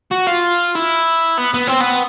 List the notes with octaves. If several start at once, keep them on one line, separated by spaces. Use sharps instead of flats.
F#4
F4
E4
B3
B3
C4
B3